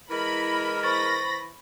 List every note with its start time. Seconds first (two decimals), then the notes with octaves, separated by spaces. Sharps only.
0.11 E3 G#3 E4 A#4 B5
0.83 C5 B5 C#6 A6 A#6